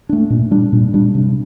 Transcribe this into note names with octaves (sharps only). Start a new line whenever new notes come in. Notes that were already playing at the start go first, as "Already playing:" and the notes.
A3 D4
A#2
G3 D4
A#2
G3 D4
C3